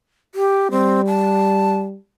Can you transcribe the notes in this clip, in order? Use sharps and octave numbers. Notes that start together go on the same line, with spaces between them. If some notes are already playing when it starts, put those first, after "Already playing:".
G4
G3 C4
A5